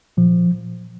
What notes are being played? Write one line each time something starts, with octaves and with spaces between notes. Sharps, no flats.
A#2 F3